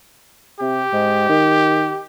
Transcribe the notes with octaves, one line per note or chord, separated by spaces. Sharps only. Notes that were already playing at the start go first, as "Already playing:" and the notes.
C3 G4
G#2
D#3